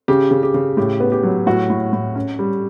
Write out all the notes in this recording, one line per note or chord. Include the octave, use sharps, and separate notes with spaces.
C#3 G4
C#3
G4
C#3
A2 G4
B3
G4
F#3
A2 F#4
A2
A2
C#4
G3